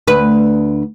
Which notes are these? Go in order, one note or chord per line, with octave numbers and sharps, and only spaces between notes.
D2 B4